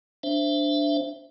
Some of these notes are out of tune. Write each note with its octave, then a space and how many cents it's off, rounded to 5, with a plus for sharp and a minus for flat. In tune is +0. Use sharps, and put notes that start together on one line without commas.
D4 +0 C5 +0 E5 +20